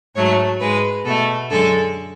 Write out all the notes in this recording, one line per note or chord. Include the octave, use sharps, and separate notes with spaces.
G#2 F#3 A3 C#5
G#2 G#3 B4
B2 A3 A4
F#2 D3 G#3 A4